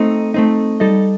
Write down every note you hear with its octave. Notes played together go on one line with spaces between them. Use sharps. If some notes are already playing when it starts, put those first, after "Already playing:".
Already playing: A3 C4 D#4
A3 C4 D#4
G3 D#4 A4 D#5